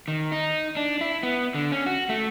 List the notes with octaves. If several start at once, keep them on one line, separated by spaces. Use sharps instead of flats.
D#3
D#4
D4
E4
B3
D3
C#4
F#4
A3